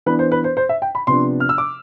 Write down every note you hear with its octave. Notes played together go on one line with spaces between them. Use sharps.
E3 B3 D4 B4
C5
B4
C5
C5
E5
G5
B5
C3 F3 B3 D4 C6
F6
E6
D6